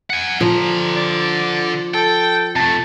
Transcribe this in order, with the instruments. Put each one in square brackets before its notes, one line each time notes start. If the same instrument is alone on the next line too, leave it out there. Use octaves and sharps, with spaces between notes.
[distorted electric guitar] F#5 G#5
[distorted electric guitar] D3 A#5 [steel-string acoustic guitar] F3
[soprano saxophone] D5
[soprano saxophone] A4 [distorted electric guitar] G5
[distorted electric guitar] C3 A3 [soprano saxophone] A5